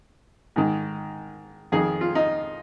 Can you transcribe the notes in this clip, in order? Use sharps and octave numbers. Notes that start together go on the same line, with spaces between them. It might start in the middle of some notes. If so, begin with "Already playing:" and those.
G#2 D#3
F2 D#3 G#4
F4
D#4